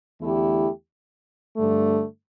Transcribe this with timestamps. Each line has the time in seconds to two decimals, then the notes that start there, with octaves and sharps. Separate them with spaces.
0.20 E2 D3 A3 E4 G4
1.56 G2 D3 A3